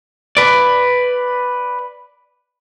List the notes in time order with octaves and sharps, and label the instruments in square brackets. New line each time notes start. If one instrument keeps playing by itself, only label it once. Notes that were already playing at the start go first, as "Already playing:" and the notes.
[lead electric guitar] B4 D5